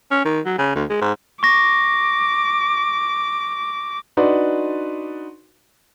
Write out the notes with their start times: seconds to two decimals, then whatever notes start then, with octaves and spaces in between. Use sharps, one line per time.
0.11 C#4
0.25 D#3
0.46 F#3
0.58 C#3
0.76 D2
0.90 G#3
1.02 G#2
1.43 C#6 D6 A#6
4.17 D4 D#4 F#4 B4 D5 C6